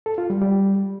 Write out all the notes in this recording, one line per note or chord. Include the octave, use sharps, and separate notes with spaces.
A4
F4
G3
G3